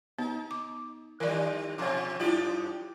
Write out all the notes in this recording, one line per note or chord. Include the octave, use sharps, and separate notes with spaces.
B3 D#4
D6
D#3 G3 A#4 D5
B2 F3 C#4 D6
F#2 E4 F4 G4 D5